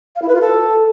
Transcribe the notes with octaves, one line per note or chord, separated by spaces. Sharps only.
F5
E4
B4
F4
A4